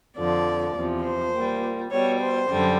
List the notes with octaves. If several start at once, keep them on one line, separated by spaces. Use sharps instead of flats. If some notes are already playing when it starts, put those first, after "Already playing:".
F2 D3 F3 D5
E2 C3 F3
C5
A#2 G3
B2 G3 C#5
C5
F#2 D3 G3